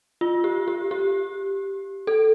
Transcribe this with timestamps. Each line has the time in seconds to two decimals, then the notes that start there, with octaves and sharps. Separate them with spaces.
0.21 F4
0.44 G4
0.68 G4
0.91 G4
2.07 A4